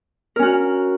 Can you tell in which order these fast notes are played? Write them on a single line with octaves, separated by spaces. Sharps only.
A#4 C#4 F#4